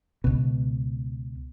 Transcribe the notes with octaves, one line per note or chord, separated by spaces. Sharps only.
C#2 B2